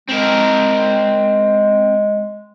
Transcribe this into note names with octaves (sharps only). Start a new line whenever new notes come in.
G#3 C4 A#4